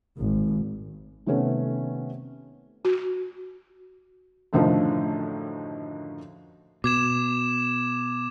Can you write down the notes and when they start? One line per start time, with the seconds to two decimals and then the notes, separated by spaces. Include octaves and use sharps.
0.17 G#1
1.26 C3 D#3 A3 B3 C#4
2.85 F#4
4.53 F#2 A2 D3 D#3 F3
6.84 B2 D6 G#6 E7